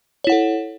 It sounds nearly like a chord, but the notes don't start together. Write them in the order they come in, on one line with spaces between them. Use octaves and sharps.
C#5 E4 F#5 A4